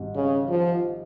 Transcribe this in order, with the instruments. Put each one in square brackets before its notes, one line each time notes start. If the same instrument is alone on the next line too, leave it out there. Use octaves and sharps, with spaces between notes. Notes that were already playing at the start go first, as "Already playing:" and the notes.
Already playing: [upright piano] G#1 G#2 G3 C4
[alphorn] C#3
F3